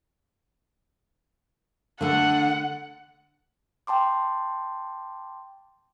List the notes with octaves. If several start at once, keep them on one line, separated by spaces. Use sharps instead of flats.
D3 A3 F#5
G5 A5 C6 D6